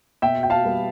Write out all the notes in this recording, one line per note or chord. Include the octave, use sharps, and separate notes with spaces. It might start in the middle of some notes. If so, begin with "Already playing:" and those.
B2 E5 G5
G5
F5 A5
G3 B3